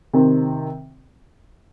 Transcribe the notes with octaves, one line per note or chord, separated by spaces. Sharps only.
C3 D#3 C4